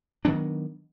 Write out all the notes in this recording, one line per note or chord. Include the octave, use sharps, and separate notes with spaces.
D#3 F#3 B3 D4